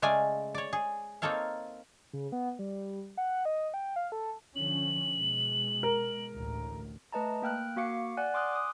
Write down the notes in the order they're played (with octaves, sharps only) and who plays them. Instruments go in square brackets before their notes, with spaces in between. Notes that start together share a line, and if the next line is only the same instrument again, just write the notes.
[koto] C#3 G#3 A3 D5 F5 G#5
C#5 D5
G#4
A#3 C4 D#4 A4 C#5 F5
[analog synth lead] C#3
B3
G3
F#5
D#5
G5
F5
A4
[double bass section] D3 F3 C#4 [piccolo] F#7
[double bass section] B2 G#3
[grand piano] A#4
[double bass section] A1 D2 A2
[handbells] A3 B4 D#5 A5 A#5
A#3 G5 F6 F#6
A#3 F#4 F5 D6 C#7
D5 F#5 G#5 F#6
G#5 C6 D6 D#6 F6 F#6
D6 D#6